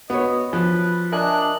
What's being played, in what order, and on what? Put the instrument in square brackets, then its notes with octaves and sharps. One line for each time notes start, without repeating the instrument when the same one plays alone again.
[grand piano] B3 [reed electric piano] F#4 C#5 [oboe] D#5
[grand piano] F3 [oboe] B4
[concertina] D4 F#6 [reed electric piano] A#4 E5 G#5 [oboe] D#5